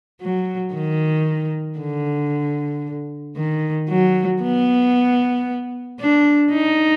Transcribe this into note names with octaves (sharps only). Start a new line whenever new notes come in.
F#3
D#3
D3
D#3
F#3
B3
D4
D#4